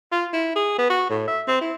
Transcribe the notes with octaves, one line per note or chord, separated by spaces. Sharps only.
F4
E4
G#4
B3
F#4
A2
E5
C4
E4